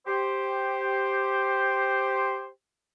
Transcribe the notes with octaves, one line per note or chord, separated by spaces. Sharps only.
G4 C5